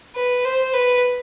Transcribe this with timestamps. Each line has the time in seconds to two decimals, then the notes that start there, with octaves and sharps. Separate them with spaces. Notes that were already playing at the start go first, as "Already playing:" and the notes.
0.16 B4
0.45 C5
0.74 B4